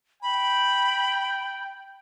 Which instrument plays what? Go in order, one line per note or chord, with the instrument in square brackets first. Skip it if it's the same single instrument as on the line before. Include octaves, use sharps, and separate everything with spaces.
[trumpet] G5 [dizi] B5